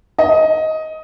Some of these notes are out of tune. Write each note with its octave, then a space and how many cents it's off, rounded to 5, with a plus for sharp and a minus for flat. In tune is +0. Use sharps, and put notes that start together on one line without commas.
D#5 +15